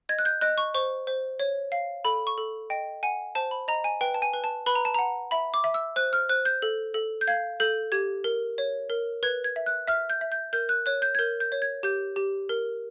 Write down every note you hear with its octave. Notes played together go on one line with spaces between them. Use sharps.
D#5 G#6
F#6
G6
D#5 F#6
C#6
C5 C#6
C5
C#5
F5
A4 B5
C#6
A4
D#5 G5
F#5 G#5
C5 A5
B5
D#5 A#5
G#5
B4 G5
A5
G#5
B4
A5
B4 B5
A#5
A5
F#5 A#5
E5 B5
D6
E5
E6
C5 F#6
F6
C5 F#6
G6
A4
A4
G6
F5 G#6
A4 G6
G4 G#6
A#4
C#5
A#4
B4 G#6
G#6
E5
F#6
E5 F6
G6
E5
G6
A#4 G6
F#6
C#5 F#6
G6
G#6
A#4 G6
G6
C#5
G#6
G4 G6
G4
A#4